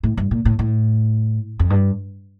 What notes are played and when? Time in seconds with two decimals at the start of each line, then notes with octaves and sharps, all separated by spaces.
0.03 A2
0.17 G2
0.31 A#2
0.45 A2
0.59 A2
1.59 F2
1.70 G2